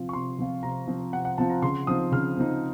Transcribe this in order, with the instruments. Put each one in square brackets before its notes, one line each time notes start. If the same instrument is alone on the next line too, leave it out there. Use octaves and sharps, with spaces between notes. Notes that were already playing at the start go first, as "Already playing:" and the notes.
Already playing: [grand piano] C3 F3 C4 F4
C#6
C3 C6
F3 C4 F4
C3 A#5
F3 C4 F4
C3 F#5
F#5
F3 C4 F4 A5
A#5
C#3 C6
F3 C4 D#4 D#6
C#3 F6
F3 C4 D#4